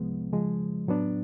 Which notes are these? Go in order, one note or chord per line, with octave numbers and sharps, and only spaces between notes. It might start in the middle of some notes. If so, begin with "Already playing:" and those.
Already playing: C2 C3 F3 G#3 B3
C#3 F3 G#3
A2 F#3 B3 D4